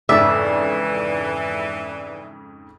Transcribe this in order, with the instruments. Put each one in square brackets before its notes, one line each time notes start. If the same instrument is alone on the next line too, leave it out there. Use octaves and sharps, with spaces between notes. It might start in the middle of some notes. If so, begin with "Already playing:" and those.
[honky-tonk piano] F2 G#2 C#3 [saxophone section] E3 [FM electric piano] D5 A5 [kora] E5